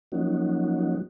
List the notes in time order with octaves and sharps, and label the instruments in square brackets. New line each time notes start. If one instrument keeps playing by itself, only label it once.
[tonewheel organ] F3 F#3 A#3 C#4 D#4 F#4